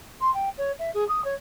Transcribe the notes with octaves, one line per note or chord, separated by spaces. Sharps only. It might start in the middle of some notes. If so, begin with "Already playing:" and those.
C6
G5
C#5
E5
G#4
D#6
C#5